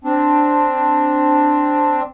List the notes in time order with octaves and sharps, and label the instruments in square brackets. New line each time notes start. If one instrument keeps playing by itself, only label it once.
[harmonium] C4 D4